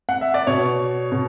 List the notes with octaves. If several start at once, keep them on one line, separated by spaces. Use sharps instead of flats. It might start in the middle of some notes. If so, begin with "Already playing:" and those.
F#5
E5
D5
B2 C#5
B2